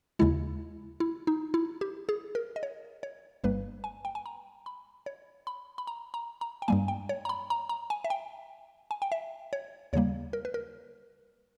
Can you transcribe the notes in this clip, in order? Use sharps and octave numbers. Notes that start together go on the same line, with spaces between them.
D#2 C#3 G#3 E4
E4
D#4
E4
G4
G#4
A#4
D#5
C#5
C#5
G1 G2 G3 A#3 B4
G#5
G5
G#5
A#5
B5
C#5
B5
B5
A#5
A#5
A#5
G5
G2 G3 A#3 G#5
G5
C#5
A#5
B5
A#5
A#5
G#5
E5
G5
G#5
G5
E5
C#5
D#2 C#3 G3 A#3 C#5
A#4
B4
A#4